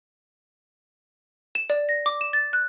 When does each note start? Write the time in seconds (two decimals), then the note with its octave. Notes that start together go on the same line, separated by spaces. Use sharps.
1.55 E7
1.70 D5
1.89 A#6
2.06 D6
2.21 E7
2.33 A6
2.53 F#6